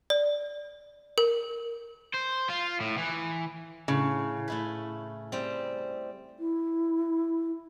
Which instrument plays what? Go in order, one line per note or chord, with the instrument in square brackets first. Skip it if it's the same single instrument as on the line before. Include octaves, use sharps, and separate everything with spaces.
[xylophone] D5
A#4
[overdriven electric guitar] C5
F4
A2
E3
[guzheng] A2 [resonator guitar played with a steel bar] C#3
[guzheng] A3 E4 B4
G3 C4
[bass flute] E4